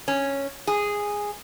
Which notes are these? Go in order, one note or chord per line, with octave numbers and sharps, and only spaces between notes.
C#4
G#4